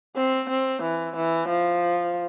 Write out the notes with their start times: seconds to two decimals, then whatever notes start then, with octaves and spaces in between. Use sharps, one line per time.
0.16 C4
0.49 C4
0.82 E3
1.16 E3
1.48 F3